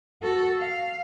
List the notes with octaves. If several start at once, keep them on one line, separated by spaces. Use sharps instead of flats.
F#4 A4
F5